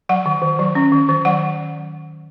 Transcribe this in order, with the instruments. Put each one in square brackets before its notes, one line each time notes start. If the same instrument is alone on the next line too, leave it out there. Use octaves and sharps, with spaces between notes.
[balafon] F#3 F#5
D#3
D#3
F#3
C#4
D#3
D#3
F#3 F#5